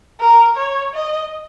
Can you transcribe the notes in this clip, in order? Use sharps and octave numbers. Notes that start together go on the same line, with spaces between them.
A#4
C#5
D#5